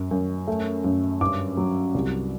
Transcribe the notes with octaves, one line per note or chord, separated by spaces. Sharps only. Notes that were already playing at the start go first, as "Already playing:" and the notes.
Already playing: F#2
F#2
A3
F#2
G2 D6
F#3
C2